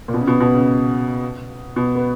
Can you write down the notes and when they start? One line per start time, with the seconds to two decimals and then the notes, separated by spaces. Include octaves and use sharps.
0.08 A#2
0.14 B2
0.21 C#3
0.27 B2
0.40 B2
0.54 C#3
1.76 B2
1.95 B3